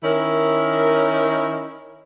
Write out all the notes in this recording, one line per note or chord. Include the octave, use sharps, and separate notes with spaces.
D#3 C#4 E4 A#4